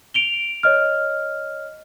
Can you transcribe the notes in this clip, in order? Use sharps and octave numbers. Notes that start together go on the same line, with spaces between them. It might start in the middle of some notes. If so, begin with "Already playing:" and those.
D7 F7 G7
C#5 D#5 F6